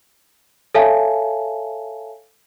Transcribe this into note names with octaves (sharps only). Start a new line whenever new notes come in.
A4 C#5 E5 F5 G#5 A5